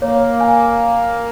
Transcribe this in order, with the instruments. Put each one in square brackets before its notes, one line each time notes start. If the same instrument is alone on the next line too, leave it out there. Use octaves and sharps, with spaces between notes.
[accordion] A#3 [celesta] C#5
[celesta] G#5